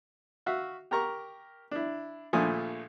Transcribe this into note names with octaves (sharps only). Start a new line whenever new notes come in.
F#4 E5 F5
G4 A#4 A#5 C#6
D4 E4
A#1 A#2 F3 A3 G#5 D#6